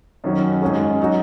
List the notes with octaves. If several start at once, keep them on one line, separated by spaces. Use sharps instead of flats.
F#2 D#3 F#3 C#4 F#4
G#2 G#3 C#4 G#4
F#3 D#4 F#4